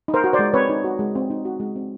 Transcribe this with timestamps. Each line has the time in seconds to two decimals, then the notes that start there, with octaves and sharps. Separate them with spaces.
0.08 D#4
0.14 A#4 C5
0.24 F#4
0.33 C5 D5
0.39 G#3
0.54 C4 B4 C#5
0.69 D#4
0.84 F#4
0.99 G#3
1.15 C4
1.30 D#4
1.45 F#4
1.60 G#3
1.76 C4